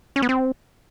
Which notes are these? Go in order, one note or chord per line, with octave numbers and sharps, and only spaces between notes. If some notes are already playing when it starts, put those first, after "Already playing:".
C#4
B3
C4